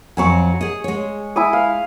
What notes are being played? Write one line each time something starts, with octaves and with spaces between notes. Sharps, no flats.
F2 F#3 C4 G#5 C#6
G#4 D#5
G#3 C#5
E4 G#5 D#6
F5